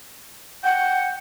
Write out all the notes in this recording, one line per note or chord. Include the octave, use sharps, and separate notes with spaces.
F#5 G5